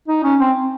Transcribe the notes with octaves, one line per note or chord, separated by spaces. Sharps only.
D#4
C#4
C4